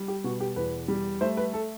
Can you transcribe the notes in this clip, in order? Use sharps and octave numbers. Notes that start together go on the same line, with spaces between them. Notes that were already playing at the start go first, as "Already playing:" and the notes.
Already playing: G3
G4
B2 F#4
G4
E2 B4
G3
A3 C5
B4
A4